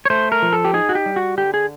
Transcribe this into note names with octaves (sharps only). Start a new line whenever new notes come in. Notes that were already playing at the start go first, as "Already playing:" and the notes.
C#5
A3 C5
A#4
F3
A4
G4
D#4 G#4
F#4
G4
G3
F#4
D3 G4
G#4